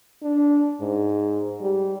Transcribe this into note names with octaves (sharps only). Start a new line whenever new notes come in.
D4
G#2
G3